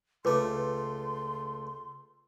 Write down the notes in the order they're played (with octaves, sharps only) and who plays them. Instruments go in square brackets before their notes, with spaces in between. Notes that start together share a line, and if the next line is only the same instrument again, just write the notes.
[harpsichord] C#2 A3 [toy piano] F4 B4 D6 [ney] C6